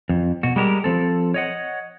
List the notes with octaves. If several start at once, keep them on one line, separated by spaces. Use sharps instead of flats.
F2
B2 F#4
G3 G#3 G4 A#4
F3 C4 A4
C#5 D#5 F#5